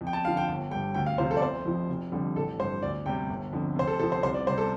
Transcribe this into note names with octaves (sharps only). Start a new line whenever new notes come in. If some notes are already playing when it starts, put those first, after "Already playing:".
F2
G5
A5
D3 F3 F5
G5
G1 G5
G2 G3 G5
D2 G5
F5
C3 F3 C5
A4
D5
F1 C5
F2 F3
F1
F2 D3 G3
A1 A4
G2 G3 C5
D2 D5
C3 G3 G5
G1
F2 D3
F1 C5
A4
F2 F3 A4
C5
C2 C5
D5
C3 G3 C5
A4